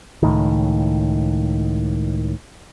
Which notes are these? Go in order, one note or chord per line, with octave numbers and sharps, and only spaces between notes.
C#2 A2 D#3